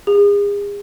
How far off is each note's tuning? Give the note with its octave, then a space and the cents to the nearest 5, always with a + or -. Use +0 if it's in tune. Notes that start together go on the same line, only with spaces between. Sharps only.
G#4 -40